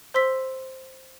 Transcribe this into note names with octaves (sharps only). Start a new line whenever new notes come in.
C5 C6 E6 B6